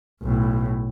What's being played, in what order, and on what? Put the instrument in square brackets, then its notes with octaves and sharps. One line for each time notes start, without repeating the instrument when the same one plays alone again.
[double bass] B1 A2